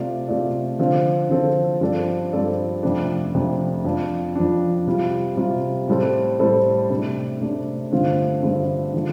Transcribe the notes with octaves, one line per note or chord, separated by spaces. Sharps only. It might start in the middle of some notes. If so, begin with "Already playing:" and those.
Already playing: C3 A3 F4 D5
C3 A3 F4 D5
D3 F3 C4 F4 A4
D3 F3 C4 F4 A4
G2 F3 C4 A4 D5
G2 F3 C4 A4 D5
F2 C3 A3 D4
F2 C3 A3 D4
F2 F3 D4
F2 F3 D4
C3 G3 F4
C3 G3 F4
A2 G3 C4 A4 C5
A2 G3 C4 A4 C5
C3 A3 D4
C3 A3 D4
G2 D3 A3 C4 F4
G2 D3 A3 C4 F4
D3 F3 A3